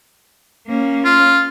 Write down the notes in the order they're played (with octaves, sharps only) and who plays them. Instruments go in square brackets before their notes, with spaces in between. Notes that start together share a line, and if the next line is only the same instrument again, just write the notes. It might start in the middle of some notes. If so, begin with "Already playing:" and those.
[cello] A#3 C#4
[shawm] F4